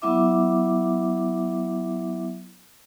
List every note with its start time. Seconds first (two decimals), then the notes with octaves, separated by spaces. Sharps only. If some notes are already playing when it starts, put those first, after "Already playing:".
0.02 F#3 B3 E4 E5 D6